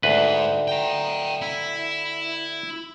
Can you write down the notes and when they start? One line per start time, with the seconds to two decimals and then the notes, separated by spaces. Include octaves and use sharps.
0.03 D2 G#2 B4
0.68 G5 A#5
1.41 E4